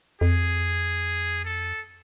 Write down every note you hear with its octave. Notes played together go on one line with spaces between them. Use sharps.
F2 G#4
A4